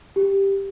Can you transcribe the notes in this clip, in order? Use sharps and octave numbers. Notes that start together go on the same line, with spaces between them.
G4